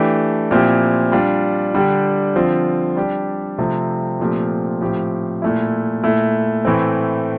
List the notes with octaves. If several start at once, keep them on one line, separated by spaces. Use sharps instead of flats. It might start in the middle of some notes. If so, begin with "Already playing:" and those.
Already playing: E3 A3 D4 G4
A#2 F3 C4 E4 G4
G3 D4 F4
D3 G3 D4 G4
D3 F3 C4 F4
G3 D4 G4
C3 F3 A3 C4 G4
A#2 F3 A3 C4 G4
A2 F3 C4 G4
A#2 A3 E4
A#2 A3 E4
A2 E3 A3 C4